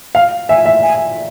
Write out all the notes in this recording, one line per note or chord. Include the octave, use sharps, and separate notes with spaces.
F5
E5 G#5
E5
G#5